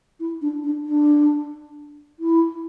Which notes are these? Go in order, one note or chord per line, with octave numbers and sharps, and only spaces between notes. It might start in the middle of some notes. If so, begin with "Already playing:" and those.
E4
D4
D4
D4
E4